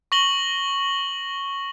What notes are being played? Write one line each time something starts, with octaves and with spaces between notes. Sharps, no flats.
C#6 A#6 F#7 G7